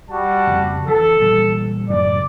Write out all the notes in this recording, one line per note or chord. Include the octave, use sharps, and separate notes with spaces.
G3 F#4 A5
F2 C#3
E3 A4
A#2 E3 G3
F#2 A2 C#3 D5